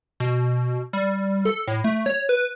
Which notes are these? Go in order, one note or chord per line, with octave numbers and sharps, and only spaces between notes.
B2
G3
A4
A2
A3
C#5
B4